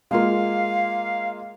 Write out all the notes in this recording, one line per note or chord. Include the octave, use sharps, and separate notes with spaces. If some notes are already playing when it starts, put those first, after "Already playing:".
G#3 A#3 F4 F5